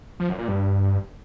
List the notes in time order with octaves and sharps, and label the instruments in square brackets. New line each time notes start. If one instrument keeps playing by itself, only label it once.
[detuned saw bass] F3
F#2
A#2
G2